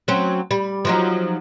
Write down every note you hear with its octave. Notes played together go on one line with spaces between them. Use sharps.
F#3 C4 C#4
G3
F3 F#3 D#4